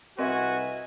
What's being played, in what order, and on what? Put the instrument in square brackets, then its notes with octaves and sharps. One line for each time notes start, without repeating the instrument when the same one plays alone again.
[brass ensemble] C2 B4 G#5 [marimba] C4 [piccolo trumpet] F#4 [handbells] A#4 D#5 E5